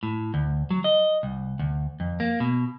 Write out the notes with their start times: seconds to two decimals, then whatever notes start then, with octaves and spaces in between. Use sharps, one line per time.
0.03 A2
0.34 D2
0.70 F#3
0.84 D#5
1.23 C2
1.59 D2
2.00 F2
2.20 A#3
2.40 B2